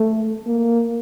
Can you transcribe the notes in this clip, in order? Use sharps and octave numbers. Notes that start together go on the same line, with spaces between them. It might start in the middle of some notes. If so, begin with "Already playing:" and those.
Already playing: A3
A#3